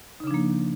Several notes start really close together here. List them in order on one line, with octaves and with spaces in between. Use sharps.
D#4 C#3 D4 F3 A#3